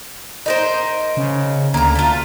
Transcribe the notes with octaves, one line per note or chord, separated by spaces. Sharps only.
D#4 A#4 C5
C#3
D2 A#3 A#5
A3 F4